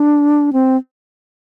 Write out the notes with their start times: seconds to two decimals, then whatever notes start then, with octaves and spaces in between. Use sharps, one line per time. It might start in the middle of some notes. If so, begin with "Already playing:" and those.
Already playing: D4
0.53 C4